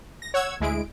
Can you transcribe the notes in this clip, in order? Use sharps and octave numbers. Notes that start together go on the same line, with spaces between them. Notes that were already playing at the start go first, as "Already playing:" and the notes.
A#6
C#5 F#5 E6 G#6
D2 G#3 E4 G#4 D7